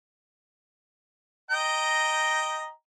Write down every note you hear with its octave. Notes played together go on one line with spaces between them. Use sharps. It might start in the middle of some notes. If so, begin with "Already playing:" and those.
D#5 G5 A#5